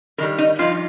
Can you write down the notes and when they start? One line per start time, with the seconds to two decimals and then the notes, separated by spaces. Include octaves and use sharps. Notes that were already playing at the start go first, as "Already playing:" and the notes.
0.18 G2 D#3 G3 A#4
0.38 D#4
0.59 G2 F3 D#4 F4